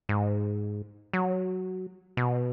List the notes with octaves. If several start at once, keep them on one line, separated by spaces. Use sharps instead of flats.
G#2
F#3
B2